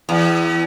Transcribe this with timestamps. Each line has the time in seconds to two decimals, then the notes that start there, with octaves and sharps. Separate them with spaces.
0.09 E2